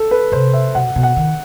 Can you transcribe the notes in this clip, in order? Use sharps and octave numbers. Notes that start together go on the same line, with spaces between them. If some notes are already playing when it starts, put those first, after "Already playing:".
Already playing: A4
B4
C3 C5
E5
B2 F#5
B2
F#5
D#3